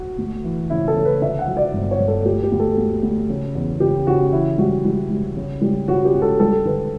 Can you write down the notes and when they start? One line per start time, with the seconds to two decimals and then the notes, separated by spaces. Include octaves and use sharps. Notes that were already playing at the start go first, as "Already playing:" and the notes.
Already playing: F#4
0.18 D2
0.44 E3
0.70 C#3 E4
0.88 A4
0.96 C#3
1.05 B4
1.21 D3 E5
1.39 F#5
1.47 F#3
1.57 D5
1.73 G1
1.91 C#5
2.00 G1
2.08 A4
2.25 D2 G4
2.43 G4
2.52 D2
2.59 A4
2.77 D2
3.03 D2
3.30 C#3
3.55 E2
3.80 C#3 G4
4.07 C#3 F#4
4.32 E3 E4
4.58 G3 F#4
4.85 G3
5.10 G3
5.37 C#3
5.62 G3
5.88 C#3 F#4
6.05 G4
6.14 C#2
6.22 A4
6.40 G3 A4
6.65 D3 B4